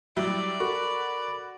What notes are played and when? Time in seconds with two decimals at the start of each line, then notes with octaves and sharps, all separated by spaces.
0.16 F#3 G3 E4 D5
0.60 F#4 A4 A#4 B5 C#6